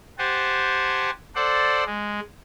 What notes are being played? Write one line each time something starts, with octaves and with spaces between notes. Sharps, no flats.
G4 C5 F#5 G#5 A5
A4 C5 D5 F#5
G#3